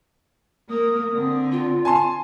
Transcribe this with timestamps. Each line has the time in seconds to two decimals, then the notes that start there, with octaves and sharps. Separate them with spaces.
0.69 A#3 D#6
1.13 D3 C4
1.52 F4
1.85 G#5 A5 C6